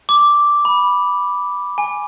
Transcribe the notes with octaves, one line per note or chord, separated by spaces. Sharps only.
D6
B5
G#5